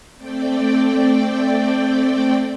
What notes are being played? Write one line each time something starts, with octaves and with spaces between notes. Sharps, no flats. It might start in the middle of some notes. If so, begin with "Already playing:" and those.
A3 C4 D5 G5